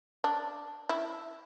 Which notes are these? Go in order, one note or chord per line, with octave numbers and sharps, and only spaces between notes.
D4
E4